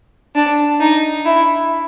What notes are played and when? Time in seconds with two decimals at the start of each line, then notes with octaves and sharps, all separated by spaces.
0.35 D4
0.80 D#4
1.25 E4